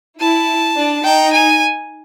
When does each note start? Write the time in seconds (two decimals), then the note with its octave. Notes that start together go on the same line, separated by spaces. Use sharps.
0.19 E4 A5
0.76 D4
1.04 D#4 G5
1.32 G#5